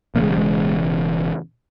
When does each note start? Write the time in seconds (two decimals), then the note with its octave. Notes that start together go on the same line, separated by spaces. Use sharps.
0.15 E1 E2 C#3 A#3
0.23 G#3
0.31 G3
0.37 G#3